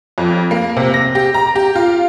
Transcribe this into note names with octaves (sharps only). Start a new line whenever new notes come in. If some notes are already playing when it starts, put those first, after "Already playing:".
F2
A#3
C3
A#6
G4
A#5
G4
F4